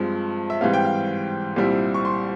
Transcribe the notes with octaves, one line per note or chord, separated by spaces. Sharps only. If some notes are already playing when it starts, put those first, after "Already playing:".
Already playing: G2 F3 G#3 C4
E5
G#2 E3 G3 C4 F5
G5
F5
C2 A#2 G3 C4 E4
C#6
C6